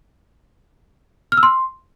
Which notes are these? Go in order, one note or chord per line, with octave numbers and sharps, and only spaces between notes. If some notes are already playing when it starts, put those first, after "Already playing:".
F6
E6
C6